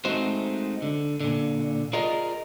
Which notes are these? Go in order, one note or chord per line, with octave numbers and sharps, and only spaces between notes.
G#3 A3 C4 D#4 F#4 C5
D3
A#2 D3
F4 G#4 A#4 D5 D#5